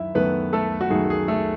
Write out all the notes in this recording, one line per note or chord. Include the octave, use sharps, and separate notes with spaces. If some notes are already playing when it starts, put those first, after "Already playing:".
Already playing: F#2 D#3 E4 E5
F#2 D#3 A3 B3 B4
A3 A4
F#4
F#2 D#3 A3 G#4
G#4
A3 A4